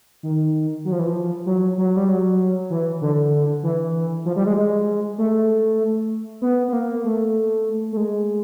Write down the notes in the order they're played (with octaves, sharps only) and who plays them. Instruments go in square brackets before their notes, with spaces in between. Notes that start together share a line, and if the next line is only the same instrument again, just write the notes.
[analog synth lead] D#3
F#3
F3
E3
F3
F#3
F#3
G3
F#3
E3
D3
E3
F3
G3
G#3
G#3
A3
B3
B3
A#3
A3
A3
G#3